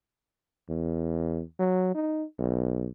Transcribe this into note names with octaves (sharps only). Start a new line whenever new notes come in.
E2
F#3
D#4
B1